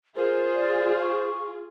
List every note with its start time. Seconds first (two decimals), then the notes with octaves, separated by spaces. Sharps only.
0.16 F4 G#4 A#4 C5
0.55 D5
1.01 C#6